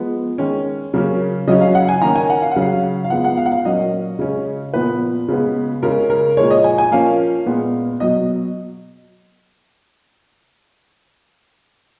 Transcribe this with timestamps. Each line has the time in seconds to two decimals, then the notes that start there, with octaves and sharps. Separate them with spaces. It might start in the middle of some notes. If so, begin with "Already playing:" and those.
Already playing: F3 G#3 B3
0.38 D#3 G#3 C#4
0.94 C#3 F#3 A#3 C#4
1.47 C#3 F#3 C#4 D#5
1.61 F5
1.75 F#5
1.88 G#5
2.02 D#3 A#3 C#4 A#5
2.15 G#5
2.30 F#5
2.42 F5
2.51 F#5
2.56 C#3 F#3 C#4 F5
3.04 F5
3.10 F3 G#3 B3 F#5
3.24 F#5
3.37 F5
3.46 F#5
3.52 F5
3.65 A#2 F#3 A#3 C#4 D#5
4.19 C#3 G#3 C#4
4.74 A#2 F3 B3 B4
5.28 C#3 G#3 B3
5.82 C#3 G#3 C#4 A#4
6.10 A#4
6.37 A#2 F3 G#3 C#5
6.51 D#5
6.64 G#5
6.78 G#5
6.91 F3 A#3 C#4 F5
7.46 A#2 G#3 B3
8.00 B2 F#3 D#5